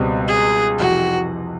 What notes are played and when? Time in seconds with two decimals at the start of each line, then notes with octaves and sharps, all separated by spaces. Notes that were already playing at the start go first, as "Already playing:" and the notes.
Already playing: C#2 B2 G3 C4
0.28 G#4
0.79 F2 C3 E3 F#4